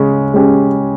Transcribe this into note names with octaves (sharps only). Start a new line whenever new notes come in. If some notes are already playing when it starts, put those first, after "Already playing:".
Already playing: C#3 G#3 C#4
G#3 C#4 G4